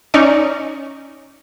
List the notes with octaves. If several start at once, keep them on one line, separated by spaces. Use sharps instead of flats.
C#4 D#4 D5 C#6